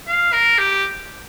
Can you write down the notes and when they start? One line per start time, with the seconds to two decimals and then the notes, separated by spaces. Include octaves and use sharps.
0.07 F5
0.33 A#4
0.58 G4